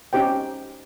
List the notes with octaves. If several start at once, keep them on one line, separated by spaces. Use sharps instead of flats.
C#4 D#4 G4 C5 G5